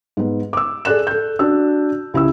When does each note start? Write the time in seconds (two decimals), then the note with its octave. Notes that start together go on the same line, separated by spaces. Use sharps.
0.17 G#2 B3
0.53 D6 E6
0.85 G#4 A4 D5 F#6 E7
1.07 A4 G6
1.39 D4 F#4 E6
2.14 C#2 E4 G4 E6